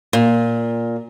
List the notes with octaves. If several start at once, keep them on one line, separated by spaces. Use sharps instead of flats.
A#2